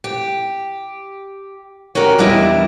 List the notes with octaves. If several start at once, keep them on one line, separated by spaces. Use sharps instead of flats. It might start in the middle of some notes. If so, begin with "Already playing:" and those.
G4
C#4 F#4 G4 A#4 D5
E2 G3 D4 E4 D#5